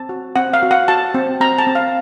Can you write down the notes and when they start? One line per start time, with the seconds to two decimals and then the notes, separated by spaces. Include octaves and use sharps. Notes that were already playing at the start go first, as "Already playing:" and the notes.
Already playing: C4 A5
0.09 F#4
0.36 C4 F#5
0.54 F5
0.63 F#4
0.71 F#5
0.88 F#4 A5
1.14 C4
1.41 C4 A#5
1.58 A5
1.67 C4
1.75 F5